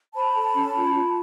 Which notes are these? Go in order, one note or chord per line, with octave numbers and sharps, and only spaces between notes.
C5 A5 B5
A4
C#4
F4
F4